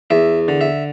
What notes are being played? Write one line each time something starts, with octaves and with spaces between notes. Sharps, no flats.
E2 E5
D3
E5